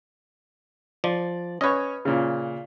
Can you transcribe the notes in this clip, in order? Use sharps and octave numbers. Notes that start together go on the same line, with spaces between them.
F3 D5
C#4 B4 C#5 D#5
A#2 C#3